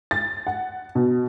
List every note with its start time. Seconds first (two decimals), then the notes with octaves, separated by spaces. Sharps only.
0.11 A6
0.47 F#5
0.95 B2